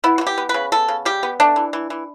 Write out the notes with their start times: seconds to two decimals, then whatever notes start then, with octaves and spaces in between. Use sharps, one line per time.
0.04 B3 E4
0.18 F#4
0.21 E3
0.27 G4
0.38 B3
0.49 B4
0.54 C#3
0.72 B3 A4
0.88 C#3
1.05 G3 G4
1.23 B3
1.40 A3 D4
1.56 E3
1.73 E3
1.90 E3